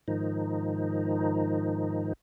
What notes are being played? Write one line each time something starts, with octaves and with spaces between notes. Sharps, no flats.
G#2 D#3 F3 D#4